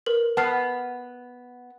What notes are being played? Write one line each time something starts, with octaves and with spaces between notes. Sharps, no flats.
A#4 B4 F#7
B3 A5 F6 C7